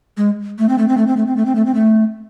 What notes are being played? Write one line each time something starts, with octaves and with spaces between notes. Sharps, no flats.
G#3
A3
C4
A3
C4
A3
C4
A3
C4
A3
C4
A3
C4
A3